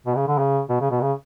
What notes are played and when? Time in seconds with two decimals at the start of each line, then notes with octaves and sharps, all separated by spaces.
0.06 B2
0.16 C#3
0.28 D3
0.38 C#3
0.69 B2
0.81 C#3
0.91 B2
1.01 C#3